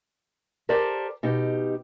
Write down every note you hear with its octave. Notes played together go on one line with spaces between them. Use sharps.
G4 A4 A#4 C5 D5
B2 D#4 G4